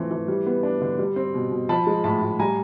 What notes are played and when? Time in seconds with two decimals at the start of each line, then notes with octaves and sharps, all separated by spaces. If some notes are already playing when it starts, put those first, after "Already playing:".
Already playing: E3 F3 A3 C4
0.11 E3
0.28 G3
0.46 B3
0.63 D4
0.82 D3
0.99 G3
1.16 C4
1.34 B2
1.52 B2
1.69 F3 A5 B5
1.87 G#3
2.04 A2 A5 B5
2.22 A2
2.39 G3 G#5 A#5